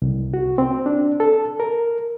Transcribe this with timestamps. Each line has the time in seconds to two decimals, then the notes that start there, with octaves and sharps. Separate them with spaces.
0.02 C2
0.34 F#4
0.58 C4
0.86 D4
1.20 A4
1.60 A#4